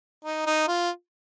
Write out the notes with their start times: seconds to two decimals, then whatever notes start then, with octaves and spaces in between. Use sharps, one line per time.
0.25 D#4
0.46 D#4
0.68 F4